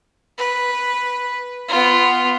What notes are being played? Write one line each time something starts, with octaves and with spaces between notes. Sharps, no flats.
B4
B3 F4